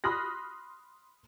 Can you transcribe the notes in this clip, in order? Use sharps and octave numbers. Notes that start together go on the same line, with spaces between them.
B5 C6 D#6 F6 F#6 A#6